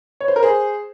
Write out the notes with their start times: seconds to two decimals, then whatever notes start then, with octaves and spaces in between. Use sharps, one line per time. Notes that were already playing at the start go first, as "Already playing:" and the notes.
0.21 C#5
0.28 C5
0.36 A#4
0.43 G#4 C5